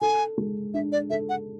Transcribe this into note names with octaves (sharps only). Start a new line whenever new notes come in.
A4 G#5
G#3
D4 E5
D5
A4 E5
F#5